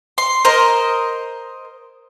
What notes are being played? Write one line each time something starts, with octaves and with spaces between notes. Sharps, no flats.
C6
A#4 C5 D#5